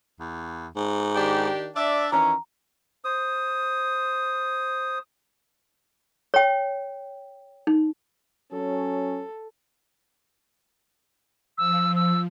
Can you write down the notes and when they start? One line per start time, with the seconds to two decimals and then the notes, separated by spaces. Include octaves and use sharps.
0.20 E2
0.76 G#2
1.15 D#3 D4 G4
1.76 D4 D5 E5
2.12 D#3 E3 C#4 A#5
3.04 C5 D#6
6.34 C#5 G5
7.67 D#4
8.52 F#3 C#4 A4
11.58 F3 E6
11.96 E6